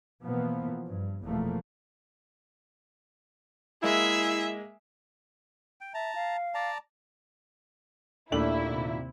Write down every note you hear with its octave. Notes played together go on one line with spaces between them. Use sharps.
B2 E3 F3 A#3 B3
G2
F1 E2 B2 F3 A3 A#3
G#3 A#3 E4 G#4 E5
G5
E5 A5 A#5
F5
D5 A5 A#5
D#2 A#2 D#3 A3 D4 E4 F#7
C3